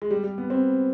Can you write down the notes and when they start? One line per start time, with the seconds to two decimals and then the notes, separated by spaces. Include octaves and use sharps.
0.02 G#3
0.11 G3
0.24 G3
0.38 B3
0.50 C4